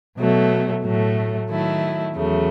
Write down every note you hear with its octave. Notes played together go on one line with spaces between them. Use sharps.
B2 F#3 A3
A2 F#3 A3
D#3 F#3 A3 E4
E2 C#3 F#3 A3